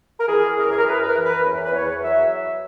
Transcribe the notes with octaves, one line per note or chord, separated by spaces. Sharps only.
A#4
E3 G#4
F#2 A#4
G#4
A#4
F#2 B4
B4
A#4
E3
B4
E2
B4
E2 C#5
F#3 E5